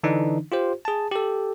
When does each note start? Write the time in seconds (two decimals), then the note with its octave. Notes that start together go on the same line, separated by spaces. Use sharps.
0.03 D3 E3 D4 D#4
0.52 F4 G4 C5
0.85 G#4 A5
1.11 G4 A4